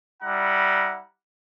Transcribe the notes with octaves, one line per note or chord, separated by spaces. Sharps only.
G3 E4 F#5 A#5